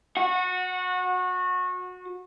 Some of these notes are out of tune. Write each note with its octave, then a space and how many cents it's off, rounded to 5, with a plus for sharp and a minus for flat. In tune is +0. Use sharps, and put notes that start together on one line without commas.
F#4 -25 F#5 -10